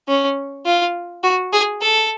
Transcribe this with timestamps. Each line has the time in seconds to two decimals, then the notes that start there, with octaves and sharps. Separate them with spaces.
0.08 C#4
0.66 F4
1.23 F#4
1.53 G#4
1.82 A4